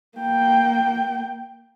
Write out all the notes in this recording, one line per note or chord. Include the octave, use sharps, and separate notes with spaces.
A#3 G5